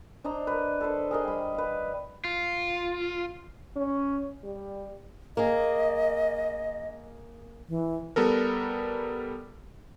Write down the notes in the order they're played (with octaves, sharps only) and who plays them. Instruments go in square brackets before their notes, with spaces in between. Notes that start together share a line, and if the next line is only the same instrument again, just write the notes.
[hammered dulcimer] D4 C5 D#5 A#5
A#4 B4
A4 B4 C5
G#4 A#4 D#5
G3 B5
B4 F5
[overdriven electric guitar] F4
[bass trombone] C#4
G3
[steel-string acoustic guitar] A#3 G#4 [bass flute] D#5
[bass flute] E3
[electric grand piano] G3 B3 A4 A#4